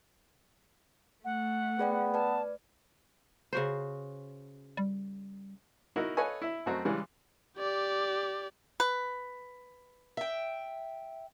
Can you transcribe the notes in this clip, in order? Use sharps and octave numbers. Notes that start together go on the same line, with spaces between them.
A3 F#5
B3 G#4 D5 G5
B4 D5 A5
C#3 F#4 C5
G3
D#4 E4 F#4 A#4
A4 B4 C#5 D#5 F5 G#5
E4 E5
F#2 A3 C4 F#4 D#5 A#5
C#3 E3 G3 G#3
G4 D5
B4
E5 G5